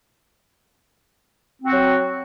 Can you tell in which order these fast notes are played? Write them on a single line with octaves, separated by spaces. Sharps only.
C4 F#4 F#3